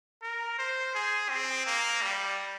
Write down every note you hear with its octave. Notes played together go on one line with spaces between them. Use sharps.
A#4
C5
G#4
C4
A#3
G3